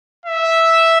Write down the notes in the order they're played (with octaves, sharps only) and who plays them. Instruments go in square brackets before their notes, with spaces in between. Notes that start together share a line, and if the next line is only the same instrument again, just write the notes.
[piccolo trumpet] E5